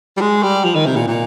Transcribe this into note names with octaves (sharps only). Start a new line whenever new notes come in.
G3
G#3
G3
F3
D#3
C3
A#2
A#2